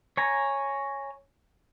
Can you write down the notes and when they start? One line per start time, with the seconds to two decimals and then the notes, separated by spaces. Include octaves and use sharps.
0.17 C#5 G#5 A#5